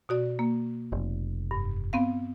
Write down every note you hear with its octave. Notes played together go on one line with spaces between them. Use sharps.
B2 F#4 D5
A#3
F1
G2
B3 C4 F5